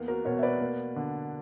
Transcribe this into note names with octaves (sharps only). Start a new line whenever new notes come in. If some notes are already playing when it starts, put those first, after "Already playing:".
Already playing: E2 A#3
F#4 A#4
B2 A#4 C#5
E5
B4 D5
A#3
D3